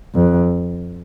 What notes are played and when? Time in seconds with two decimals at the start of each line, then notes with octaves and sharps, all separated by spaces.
0.14 F2